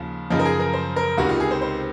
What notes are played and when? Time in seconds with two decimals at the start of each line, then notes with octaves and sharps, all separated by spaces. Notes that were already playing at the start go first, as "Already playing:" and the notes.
Already playing: D#2 C#3 F3
0.30 F#2 C#3 F3 D#4
0.39 A#4
0.45 G#4
0.59 A#4
0.74 C5
0.96 A#4
1.18 C#2 C3 D#3 F#4
1.29 F4
1.40 G#4
1.51 C5
1.62 C5